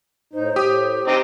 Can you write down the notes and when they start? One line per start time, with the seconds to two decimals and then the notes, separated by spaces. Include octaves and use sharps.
0.33 A2 D#4 C5
0.56 A2 G4 D#6
1.07 C4 D#4 G4